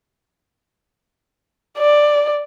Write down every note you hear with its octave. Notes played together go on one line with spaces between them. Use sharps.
D5